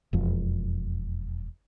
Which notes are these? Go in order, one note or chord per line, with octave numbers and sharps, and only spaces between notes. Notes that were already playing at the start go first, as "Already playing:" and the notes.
E1 F2